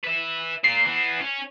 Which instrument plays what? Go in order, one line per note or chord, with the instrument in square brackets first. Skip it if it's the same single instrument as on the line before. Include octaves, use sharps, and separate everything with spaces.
[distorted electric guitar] B4 E5
[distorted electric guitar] A#2 [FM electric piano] C7
[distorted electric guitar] E3 B3
C#4